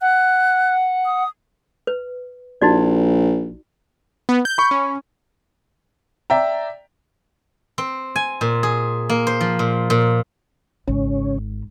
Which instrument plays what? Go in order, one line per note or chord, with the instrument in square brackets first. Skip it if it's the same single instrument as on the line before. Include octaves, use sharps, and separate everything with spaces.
[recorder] F#5 [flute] F#6
[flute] D#6
[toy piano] B4
[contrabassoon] A#1 [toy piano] D#4 F#4 D5
[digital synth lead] B3
G6
[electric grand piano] B5 C#6
[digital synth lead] C#4
[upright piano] D5 E5 G5 A#5
[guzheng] C4
G#5
A#2
G#4
A#3
C5
F3
A#2
A#2
[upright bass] G#1 [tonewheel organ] C#3 C#4